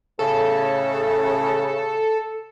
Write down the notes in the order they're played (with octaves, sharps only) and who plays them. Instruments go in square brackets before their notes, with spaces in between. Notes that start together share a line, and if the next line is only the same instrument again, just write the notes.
[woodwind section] A2 C#3 [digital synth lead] A4